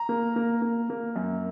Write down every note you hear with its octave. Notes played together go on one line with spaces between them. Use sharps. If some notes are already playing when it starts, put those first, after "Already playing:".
Already playing: A#5
A#3
A#3
A#3
A#3
F#2